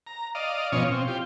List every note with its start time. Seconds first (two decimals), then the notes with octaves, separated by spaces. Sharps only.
0.07 A#5
0.35 D5 D#5 F5
0.72 B2 F3 C#4 C#5 D#5 F5
0.90 C4
1.08 F4 G4